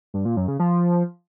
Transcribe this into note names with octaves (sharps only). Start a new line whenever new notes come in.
G2
A#2
F#2
C#3
F3